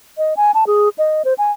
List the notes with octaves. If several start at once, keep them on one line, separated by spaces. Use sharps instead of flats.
D#5
G#5
A5
G#4
D#5
C5
G#5